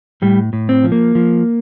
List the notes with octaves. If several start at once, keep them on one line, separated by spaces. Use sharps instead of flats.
A2 G3
A2
C4
F3
A#3
F3